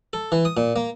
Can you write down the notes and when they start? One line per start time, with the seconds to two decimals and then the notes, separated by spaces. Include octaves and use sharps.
0.13 A4
0.32 E3
0.45 D#6
0.57 A#2
0.76 A#3